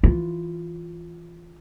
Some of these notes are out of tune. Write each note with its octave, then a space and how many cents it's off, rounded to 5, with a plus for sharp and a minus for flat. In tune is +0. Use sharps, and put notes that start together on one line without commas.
E3 +0 F4 +0